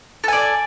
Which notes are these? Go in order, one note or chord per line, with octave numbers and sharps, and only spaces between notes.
A4 D5 G#5